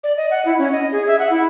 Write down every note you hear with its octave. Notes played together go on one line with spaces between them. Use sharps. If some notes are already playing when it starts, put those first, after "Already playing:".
D5
D#5
F#5
E4
C#4
D#5
G#4
E5
F#5
E4